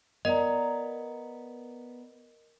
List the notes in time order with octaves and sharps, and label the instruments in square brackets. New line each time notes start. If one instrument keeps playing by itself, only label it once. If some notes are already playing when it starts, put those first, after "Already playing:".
[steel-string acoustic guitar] B3 D5 A#5 [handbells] A#4 D#5